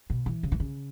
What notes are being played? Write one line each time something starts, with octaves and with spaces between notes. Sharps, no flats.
B2
E3
C#3
E3
C#3